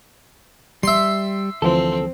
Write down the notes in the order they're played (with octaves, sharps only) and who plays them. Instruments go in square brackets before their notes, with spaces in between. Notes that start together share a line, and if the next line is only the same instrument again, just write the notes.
[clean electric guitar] G3 [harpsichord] E5 C6
[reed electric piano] D2 E3 F3 [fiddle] C4 [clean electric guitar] A4